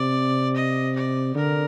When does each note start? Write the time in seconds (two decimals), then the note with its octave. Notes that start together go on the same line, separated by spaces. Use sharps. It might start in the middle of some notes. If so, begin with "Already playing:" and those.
Already playing: C3 D5
0.56 D#5
0.95 D5
1.35 D3 A#4